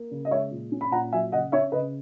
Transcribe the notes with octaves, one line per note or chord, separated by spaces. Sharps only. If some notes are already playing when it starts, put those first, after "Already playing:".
Already playing: A#3
C#3
D#5
G#3 C#5 E5
A#2
C#4
B5
A#2 F#5 A#5
F#3 E5 G#5
C#3 D#5 F#5
C#4 C#5 E5
C#3 B4 D#5